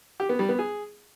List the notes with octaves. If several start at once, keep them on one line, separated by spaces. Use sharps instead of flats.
G4
B3
G3
B3
G#4